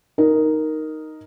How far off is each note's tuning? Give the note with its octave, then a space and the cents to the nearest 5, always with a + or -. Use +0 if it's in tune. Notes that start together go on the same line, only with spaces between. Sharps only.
D#4 +0 A#4 +0